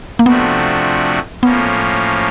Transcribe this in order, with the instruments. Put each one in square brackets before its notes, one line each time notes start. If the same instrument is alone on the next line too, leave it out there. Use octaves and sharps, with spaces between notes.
[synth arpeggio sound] A#3
[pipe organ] C3 F3 A3 D4 F#4 [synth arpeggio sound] B3
[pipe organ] A2 F3 A#3 C#4 [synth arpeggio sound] B3